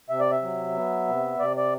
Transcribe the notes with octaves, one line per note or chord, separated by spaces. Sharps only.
C3 E5
D5
E5
F#3
B3
C3
C3 D5
D5